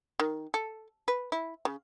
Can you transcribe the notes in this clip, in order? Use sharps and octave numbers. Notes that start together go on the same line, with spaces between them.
D#3
A4
B4
E4
C#3